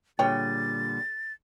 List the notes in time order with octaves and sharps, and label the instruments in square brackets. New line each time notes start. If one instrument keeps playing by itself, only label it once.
[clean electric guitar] A#2 D3 G3 [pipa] G#4 C#5 G5 [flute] A6